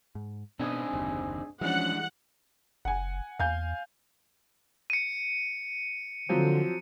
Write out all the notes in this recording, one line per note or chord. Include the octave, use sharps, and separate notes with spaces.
G#2
B2 B3 C4 D4 D#4 G#4 G#5 D#6
F#1 D#2 C3
E3 F3 G3 G#3 C#4 D4 F#5
F#1 F#5 G#5
E2 F5 G#5 G6
C#7 D#7
D3 F3 F#3 C4